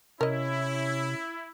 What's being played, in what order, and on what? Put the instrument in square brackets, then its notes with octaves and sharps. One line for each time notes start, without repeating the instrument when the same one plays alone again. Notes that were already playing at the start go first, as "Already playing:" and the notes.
[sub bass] C3 [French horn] C#4 [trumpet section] E4 [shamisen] A#4 D#5